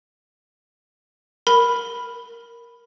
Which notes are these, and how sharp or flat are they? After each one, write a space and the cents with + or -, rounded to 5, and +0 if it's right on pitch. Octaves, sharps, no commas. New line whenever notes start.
A#4 +0 B5 +0